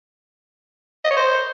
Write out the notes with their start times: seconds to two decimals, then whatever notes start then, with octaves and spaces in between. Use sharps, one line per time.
1.05 D#5
1.11 C#5
1.17 C5